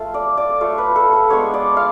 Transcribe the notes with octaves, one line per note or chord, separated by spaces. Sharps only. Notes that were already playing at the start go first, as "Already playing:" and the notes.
Already playing: A3 F4
D5
D5
A3 F4 C#5
B4
A4
A4
G#3 B3 D4 C#5
D5
F5